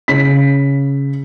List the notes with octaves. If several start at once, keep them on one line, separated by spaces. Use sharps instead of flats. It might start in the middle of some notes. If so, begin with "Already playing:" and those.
C#3 B6